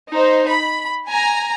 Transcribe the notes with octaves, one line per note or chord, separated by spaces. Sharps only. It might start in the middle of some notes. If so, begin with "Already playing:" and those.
D#4 C5
B5
G#5 A#5